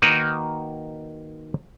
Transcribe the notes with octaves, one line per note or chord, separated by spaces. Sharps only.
D#3 A#3 D#4 F#4 A#4 B4